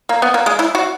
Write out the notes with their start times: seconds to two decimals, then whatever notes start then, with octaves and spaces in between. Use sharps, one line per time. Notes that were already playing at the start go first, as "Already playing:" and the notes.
0.09 A#3
0.22 B3
0.34 A#3
0.46 G#3
0.59 E4
0.75 F#4